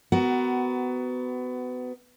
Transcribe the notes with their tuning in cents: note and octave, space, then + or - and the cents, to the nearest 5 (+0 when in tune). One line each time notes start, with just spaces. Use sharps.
B3 +25 F#4 +20 A#4 +15